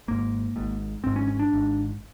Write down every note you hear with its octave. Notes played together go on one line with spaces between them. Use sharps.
G#1 G#2 A#3
G#1 G#2
G#1 G#2 C4
C#4
C#4
D4
G#1 G#2